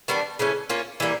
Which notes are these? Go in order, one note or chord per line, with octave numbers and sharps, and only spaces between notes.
D#3 G3 B3 D4
C#3 E3 A3 C#4
A#3 C#4 F4
E3 G3 A#3